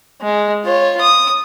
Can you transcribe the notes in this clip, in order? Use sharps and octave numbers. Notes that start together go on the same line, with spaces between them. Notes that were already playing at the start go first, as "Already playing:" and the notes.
G#3
F4 C#5
D#6